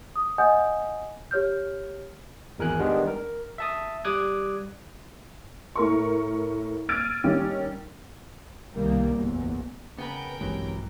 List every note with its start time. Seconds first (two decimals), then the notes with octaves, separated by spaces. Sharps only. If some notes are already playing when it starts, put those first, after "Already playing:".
0.16 D#6
0.38 D#5 F#5 G#5 D#6 G6
1.31 G4 C#5 F6 G6
2.58 G#1 E2 A#4 G#5 F#6
2.79 D#3 G3 G#3 B3 D4
3.08 A#4
3.58 E5 A5 D#6
4.05 G3 D6 D#6 F#6 G#6
5.75 A2 A#4 C#6
6.89 E6 F6 G#6 A6 D7 D#7
7.24 D#3 G3 C#4
8.74 C2 B2 D#3 G3 A#3
9.14 F#1 B1 E2
9.98 C#3 B3 A#4 B4 G5
10.41 A#1 G2 C3 E3 F#3 G#3